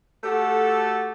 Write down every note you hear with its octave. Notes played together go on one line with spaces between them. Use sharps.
A3 F#4 G4 A4